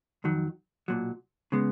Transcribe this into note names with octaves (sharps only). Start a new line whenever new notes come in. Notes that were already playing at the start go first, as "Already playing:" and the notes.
F2 D#3 F#3
B1 A#2 F#3
C#3 G#3 B3